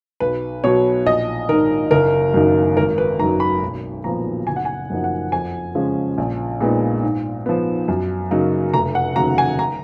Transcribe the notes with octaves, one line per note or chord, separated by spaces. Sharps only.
B1 B4
B2 F#3 C#5
A#1 D#5
G#2 D#3 A#4
F#1 A#4
F#2 D#3 A#3 D#4
G#1 A#4
B4
F#2 D#3 F#3 A#5
B5
B1
A#2 F3 B3 A#5
F#1 G#5
F#5
G#5
F#2 F3 A#3 D#4
F#5
F2 G#5
C#3 F3 G#3 C#4
A#1
A#2 G#3 B3 D#4
G#2
F3 B3
F#2
C#3 F#3 A#3 D#4
F1 A#5
F#5
D#2 C#3 F#3 A#5
G#5
A#5